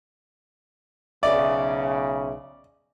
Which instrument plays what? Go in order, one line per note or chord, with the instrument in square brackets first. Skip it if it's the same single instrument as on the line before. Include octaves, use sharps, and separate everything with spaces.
[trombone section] B1 C#3 [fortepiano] D5 [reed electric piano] E5